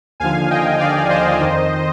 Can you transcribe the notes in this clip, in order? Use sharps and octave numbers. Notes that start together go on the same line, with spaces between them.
D#2 D3 F3 F5 G#5
D#5 G5
D5 F5
C5 D#5
F2 D#3